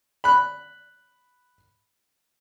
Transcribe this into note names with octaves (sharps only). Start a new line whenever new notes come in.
B5 F#6